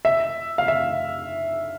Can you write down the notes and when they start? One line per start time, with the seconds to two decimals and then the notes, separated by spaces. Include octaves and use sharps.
0.05 E5
0.58 F5
0.68 E5